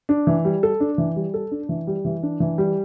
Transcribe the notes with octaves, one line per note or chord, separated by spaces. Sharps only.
D4
E3
G3
A4
D4
E3
G3
A4
D4
E3
G3
E3
D4
E3
G3